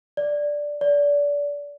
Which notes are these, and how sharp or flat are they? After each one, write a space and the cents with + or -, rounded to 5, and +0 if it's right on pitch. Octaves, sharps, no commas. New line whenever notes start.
D5 +0
D5 -25